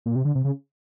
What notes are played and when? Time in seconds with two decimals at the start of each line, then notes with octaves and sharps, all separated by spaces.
0.06 A#2
0.16 C3
0.25 D3
0.35 C3
0.44 C#3